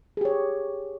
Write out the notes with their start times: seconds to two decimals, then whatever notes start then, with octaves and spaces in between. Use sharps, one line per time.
0.17 G#4
0.21 G4
0.25 C#5